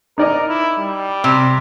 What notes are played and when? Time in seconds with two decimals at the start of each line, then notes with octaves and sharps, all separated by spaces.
0.18 D#4 A#4 D5 D#5
0.49 E4
0.79 G3
1.24 C3